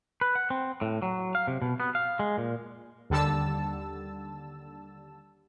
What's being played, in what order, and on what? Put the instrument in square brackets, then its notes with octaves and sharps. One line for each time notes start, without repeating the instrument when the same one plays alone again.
[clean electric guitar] B4
F#5
C4
A2
F#3
F5
C3
B2
B3
F5
G#3
A#2
[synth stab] D#2 D3 G3 A5 E6